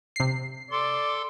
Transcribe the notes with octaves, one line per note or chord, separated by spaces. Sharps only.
C3 C7
A4 D5 C6